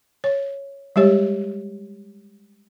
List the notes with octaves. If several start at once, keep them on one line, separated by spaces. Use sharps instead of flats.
C#5
G3 G#3 G4 C#5